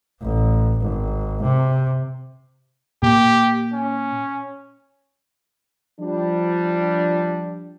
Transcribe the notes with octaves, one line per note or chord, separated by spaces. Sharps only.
A1
G#1
C3
A#2 G4
C#4
F3 G3 D4